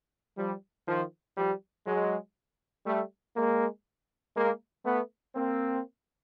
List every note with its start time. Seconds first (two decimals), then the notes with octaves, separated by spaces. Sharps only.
0.38 F3 G3
0.87 D#3 F3
1.37 F3 G3
1.87 F#3 G#3
2.86 G3 A3
3.36 G#3 A#3
4.36 G#3 A#3
4.85 A3 B3
5.35 A#3 C4